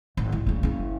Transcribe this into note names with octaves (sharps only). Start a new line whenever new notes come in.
G#1
C2
D2 C#3
F#1 C#3